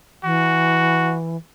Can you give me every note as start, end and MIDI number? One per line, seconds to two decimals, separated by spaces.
0.24 1.37 52
0.24 1.16 66